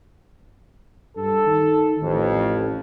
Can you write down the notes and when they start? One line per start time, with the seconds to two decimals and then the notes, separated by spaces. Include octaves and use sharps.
1.17 G2 A4
1.46 D#3
2.02 A1 F2